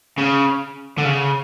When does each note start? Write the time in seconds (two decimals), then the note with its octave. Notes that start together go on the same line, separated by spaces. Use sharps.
0.18 C#3
0.98 D3
1.05 C#3